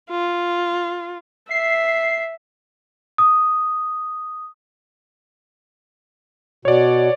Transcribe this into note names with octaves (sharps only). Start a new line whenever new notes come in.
F4
E5 C7
D#6
B2 C#5 D5